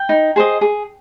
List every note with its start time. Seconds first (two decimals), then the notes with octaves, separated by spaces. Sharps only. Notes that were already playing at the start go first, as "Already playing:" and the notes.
Already playing: G5
0.09 D#4
0.36 G#4 C5 D#5
0.61 G#4